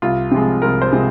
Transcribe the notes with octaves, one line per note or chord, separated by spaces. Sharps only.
C2 F4
C3 F3 G#3
C2 A#4
C5
C3 F3 G#3